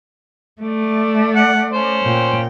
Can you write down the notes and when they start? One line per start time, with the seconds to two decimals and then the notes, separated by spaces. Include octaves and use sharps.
0.62 A3 D5
1.35 F#5
1.73 C#4 C5
2.03 A#2 G5